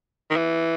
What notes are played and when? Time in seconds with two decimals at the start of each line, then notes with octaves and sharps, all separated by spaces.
0.31 D#3
0.36 E3